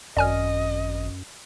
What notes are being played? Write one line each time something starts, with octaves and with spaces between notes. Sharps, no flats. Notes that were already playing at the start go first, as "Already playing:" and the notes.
G#1 F#2 D5 D#5 G#5 F6